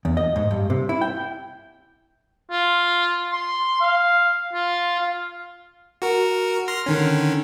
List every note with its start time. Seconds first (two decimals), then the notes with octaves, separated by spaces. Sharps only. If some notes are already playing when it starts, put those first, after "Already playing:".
0.05 E2
0.17 D#5
0.36 G#2
0.51 G2
0.70 C3
0.89 E4
1.01 G5
2.51 F4
3.33 C6
3.81 F5
4.53 F4
5.00 F5
6.02 F#4 A#4
6.68 C6 F6 A#6
6.86 D3 D#3 C#4